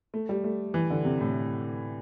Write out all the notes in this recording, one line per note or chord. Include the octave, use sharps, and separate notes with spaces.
A3
G3
A3
E3
D3
C3
A2